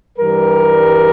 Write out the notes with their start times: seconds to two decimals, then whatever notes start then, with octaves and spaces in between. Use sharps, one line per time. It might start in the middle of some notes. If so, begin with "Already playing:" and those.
0.18 G2 E3 G3 A#4